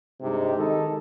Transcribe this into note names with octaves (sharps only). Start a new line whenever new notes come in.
G2 C3 G#3 D#4 G4
D#3 G#3 D#4 A4